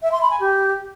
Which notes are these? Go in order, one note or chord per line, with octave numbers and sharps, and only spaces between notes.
E5
C6
B5
G#5
G4